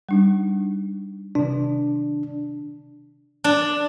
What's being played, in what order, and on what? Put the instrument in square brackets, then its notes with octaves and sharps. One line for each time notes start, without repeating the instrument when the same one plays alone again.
[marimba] G3 D4 D#4
[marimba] C3 D#3 [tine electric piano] D4
[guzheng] D4